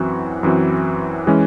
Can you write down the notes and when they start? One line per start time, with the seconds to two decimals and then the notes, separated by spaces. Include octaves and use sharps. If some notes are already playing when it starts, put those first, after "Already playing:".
Already playing: F#2 E3 C4 F#4
0.43 F#2 E3 C4 F#4
1.27 E3 G#3 C#4